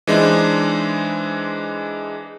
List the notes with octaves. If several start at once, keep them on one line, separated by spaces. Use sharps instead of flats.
E3 G#3 D4 D#4 C5